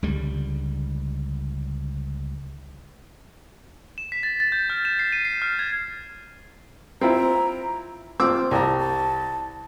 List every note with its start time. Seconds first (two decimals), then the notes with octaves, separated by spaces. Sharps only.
0.03 C#2 D3 G3
3.98 E7
4.12 B6
4.23 A6
4.40 A6
4.52 G6
4.70 F6
4.85 E7
4.99 C7
5.12 D#7
5.25 C7
5.42 F6
5.59 G#6
7.01 C4 E4 F4 A#5
8.20 C4 F4 D6 E6
8.51 C2 A5 A#5
8.80 A5